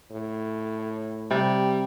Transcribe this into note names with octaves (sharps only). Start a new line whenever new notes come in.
A2
C3 G3